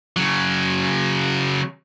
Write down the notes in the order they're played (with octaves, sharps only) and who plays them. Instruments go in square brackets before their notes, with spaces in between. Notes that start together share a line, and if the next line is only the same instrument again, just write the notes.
[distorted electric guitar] C#3 F#3